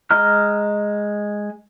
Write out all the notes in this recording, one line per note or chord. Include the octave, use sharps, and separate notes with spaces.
G#3 D#5 A#5 F6